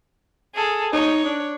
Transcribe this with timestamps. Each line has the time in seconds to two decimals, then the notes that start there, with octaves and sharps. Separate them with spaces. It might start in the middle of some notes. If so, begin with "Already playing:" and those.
0.53 G#4 A4
0.93 D#4 C#5
1.25 D4